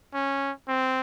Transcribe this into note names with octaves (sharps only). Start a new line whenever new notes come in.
C#4
C4